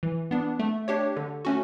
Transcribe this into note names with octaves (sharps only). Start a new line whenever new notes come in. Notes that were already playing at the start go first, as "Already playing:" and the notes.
E3
B3 D4
A3
D4 G4 C#5
D3
A3 C#4 F#4